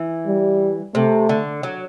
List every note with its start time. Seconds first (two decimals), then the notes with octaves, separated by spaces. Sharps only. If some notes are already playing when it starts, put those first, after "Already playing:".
Already playing: E3
0.27 G3
0.95 C3 A3
1.29 D3
1.63 F#3